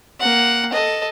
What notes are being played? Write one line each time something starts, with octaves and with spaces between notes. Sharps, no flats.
A#3 F#5
A4 D#5